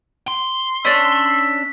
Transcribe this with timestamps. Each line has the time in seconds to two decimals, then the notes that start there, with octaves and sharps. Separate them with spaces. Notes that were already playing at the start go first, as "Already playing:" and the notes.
0.28 C6
0.85 C#4 D4 E6 B6